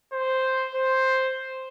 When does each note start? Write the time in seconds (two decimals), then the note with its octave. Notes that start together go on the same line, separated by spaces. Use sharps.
0.13 C5
0.75 C5